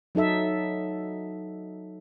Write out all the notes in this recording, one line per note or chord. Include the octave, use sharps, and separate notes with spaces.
F#3 D#4 A4 E5